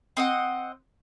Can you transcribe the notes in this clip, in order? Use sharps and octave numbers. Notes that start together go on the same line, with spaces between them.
C4 D#5 F#5